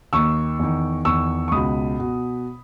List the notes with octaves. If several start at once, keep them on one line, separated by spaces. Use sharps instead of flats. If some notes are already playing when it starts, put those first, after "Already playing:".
D#2 D#3 C#6 E6
E2 D#3
E2 D#3 C#6 E6
C#6
C#2 B2 B5 D#6
B2